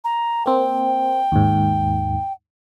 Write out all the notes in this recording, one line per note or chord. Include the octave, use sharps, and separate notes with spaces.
A#5
A#3 C4 G5
D#2 G#2